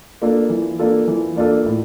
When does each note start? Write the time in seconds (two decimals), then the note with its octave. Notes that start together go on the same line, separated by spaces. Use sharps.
0.22 A#3 D4 F4 A4
0.50 E3
0.79 A#3 D4 F4 A4
1.08 E3
1.36 A#3 D4 F4 A4
1.66 A2